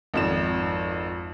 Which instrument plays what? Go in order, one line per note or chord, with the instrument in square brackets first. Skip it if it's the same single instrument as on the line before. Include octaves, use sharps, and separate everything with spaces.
[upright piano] G#1 F2 E7